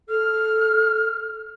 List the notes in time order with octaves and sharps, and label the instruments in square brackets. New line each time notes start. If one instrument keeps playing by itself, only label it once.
[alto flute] A4 [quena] F6